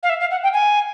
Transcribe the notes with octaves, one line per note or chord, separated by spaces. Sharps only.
F5
E5
F5
F#5
G5
G#5